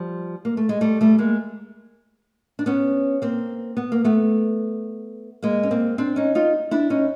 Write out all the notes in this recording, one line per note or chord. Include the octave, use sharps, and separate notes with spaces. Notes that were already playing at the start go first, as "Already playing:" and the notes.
Already playing: F3 G3
A#3
A3
G#3
G3 A3
G3 A3
G#3 A#3
D4
B3 C#4
A#3 C4
B3
A#3
A3 B3
G#3 A#3
C#4
A#3 C4
C4 D4
C#4 D#4
D#4 F4
D4 E4
C#4 D#4